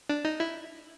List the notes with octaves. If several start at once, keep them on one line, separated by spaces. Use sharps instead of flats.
D4
D#4
E4